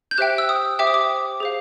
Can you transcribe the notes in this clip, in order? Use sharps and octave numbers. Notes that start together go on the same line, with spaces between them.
G6
G4 C5 E5 G5 F#6
E6
D#6
G4 C5 E5 G5 D6
D#6
D6
G#4 C5 F5